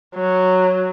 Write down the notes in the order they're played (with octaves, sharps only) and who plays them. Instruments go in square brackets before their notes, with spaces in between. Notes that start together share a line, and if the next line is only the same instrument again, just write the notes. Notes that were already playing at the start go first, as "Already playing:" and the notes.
[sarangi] F#3